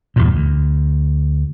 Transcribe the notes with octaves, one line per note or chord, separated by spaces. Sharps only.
E2 G2 A#2
D2